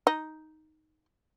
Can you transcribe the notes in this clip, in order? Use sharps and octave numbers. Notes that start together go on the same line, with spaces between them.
D#4